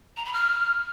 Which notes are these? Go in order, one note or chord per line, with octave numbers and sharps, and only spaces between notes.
A#5
B5
F6